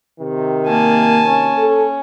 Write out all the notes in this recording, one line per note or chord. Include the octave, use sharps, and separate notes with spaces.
C3 D#3
A#3 G#5 A5
C#4
A4